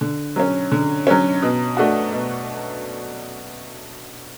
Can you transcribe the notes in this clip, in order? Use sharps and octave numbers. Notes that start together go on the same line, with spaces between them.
D3
F#3 C#4
D3
F#3 C#4
B2
A3 D4 F#4
B2